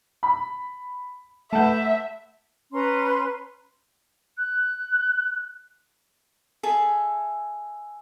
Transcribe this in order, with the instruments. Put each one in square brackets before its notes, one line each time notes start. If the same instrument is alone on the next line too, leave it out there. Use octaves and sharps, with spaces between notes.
[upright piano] B5
[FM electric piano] A3 G6 [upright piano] B4 F#5 A5 [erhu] E5
[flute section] C#4 B4 A#5 C6
[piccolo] F#6
[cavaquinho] G#4 A4 E5 A5